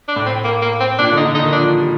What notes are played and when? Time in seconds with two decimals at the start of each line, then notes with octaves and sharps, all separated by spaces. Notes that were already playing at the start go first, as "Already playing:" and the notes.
0.08 D4
0.16 A2
0.26 C4
0.44 A#3
0.62 A#3
0.80 C4
0.99 A#2 D4
1.12 D3
1.17 D#4
1.25 D3
1.35 D#4
1.39 D#3
1.52 F3 D4
1.80 G3